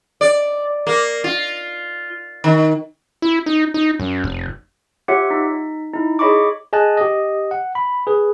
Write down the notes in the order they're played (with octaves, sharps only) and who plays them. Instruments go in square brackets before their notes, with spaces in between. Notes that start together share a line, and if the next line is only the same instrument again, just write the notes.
[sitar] D5
A#3
F4
D#3
[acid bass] E4
D#4
D#4
F#2
F1
[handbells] F4 G4 C#5 E5 F#5
D#4 B6
D#4 E4
G#4 C#5 D#5 B5 C#6 D6
[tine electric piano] G#4 D#5 G#5 A5 F#6
G4 D#5
F#5
B5
G#4 B4